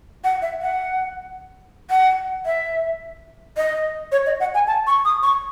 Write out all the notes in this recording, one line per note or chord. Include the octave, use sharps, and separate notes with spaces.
F#5
E5
F#5
F#5
E5
D#5
C#5
D#5
F#5
G#5
A5
C#6
D#6
C#6